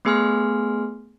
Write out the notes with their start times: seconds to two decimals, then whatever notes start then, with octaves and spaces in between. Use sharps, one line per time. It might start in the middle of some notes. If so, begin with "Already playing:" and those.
0.05 A3 B3 G#4 G#5 C6 F6